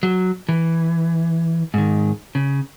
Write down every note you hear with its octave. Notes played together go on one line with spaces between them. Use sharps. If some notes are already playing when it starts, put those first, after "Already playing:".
F#3
E3
G#2 D#3
C#3